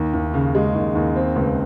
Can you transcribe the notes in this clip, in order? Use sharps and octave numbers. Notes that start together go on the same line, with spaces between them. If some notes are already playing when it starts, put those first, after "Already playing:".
Already playing: D#2
D#2
C#3
G#3
D#2
D#2
C4
C#2